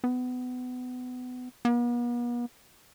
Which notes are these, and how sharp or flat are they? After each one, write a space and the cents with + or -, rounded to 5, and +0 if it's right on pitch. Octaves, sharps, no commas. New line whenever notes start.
B3 +25
B3 -45